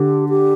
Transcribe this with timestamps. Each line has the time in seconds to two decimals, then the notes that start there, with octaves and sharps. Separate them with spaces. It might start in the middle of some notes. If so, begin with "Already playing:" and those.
Already playing: D3 G4
0.29 G4